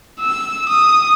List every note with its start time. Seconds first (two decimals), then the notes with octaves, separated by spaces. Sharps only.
0.20 E6
0.69 D#6